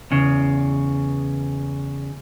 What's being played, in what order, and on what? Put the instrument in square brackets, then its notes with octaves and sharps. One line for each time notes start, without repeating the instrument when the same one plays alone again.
[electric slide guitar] E2 C#3